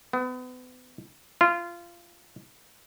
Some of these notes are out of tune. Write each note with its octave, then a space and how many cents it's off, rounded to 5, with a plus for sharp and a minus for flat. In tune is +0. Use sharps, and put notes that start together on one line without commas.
B3 +35
F4 -20